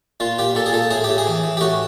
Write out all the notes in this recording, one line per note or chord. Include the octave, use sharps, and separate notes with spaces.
A#2 F4
A#2 G4
A#2 A4
G#4
A#2 A4
A2 G#4
A2 G4
G#4
E3
E3
G4
A2 F#4